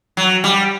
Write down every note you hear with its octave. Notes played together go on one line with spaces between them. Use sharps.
F#3
G3